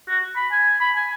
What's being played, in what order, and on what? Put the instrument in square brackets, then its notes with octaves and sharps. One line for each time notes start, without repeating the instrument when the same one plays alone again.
[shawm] F#4
B5
G#5
B5
G#5